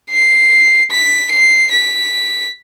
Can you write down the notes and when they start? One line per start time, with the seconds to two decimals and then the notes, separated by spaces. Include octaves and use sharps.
0.10 C7
0.90 B6
1.31 C7
1.71 B6